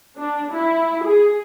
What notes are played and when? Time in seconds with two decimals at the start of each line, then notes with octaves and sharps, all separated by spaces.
0.17 D4
0.51 E4
1.04 G#4